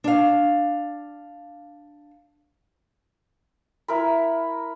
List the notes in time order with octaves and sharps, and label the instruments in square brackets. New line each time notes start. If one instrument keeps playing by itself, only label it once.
[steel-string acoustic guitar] D4 F5
[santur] E4 A#4 B5